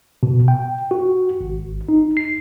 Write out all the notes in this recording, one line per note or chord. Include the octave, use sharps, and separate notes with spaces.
B2
G5
F#4
G#1
D#4
C7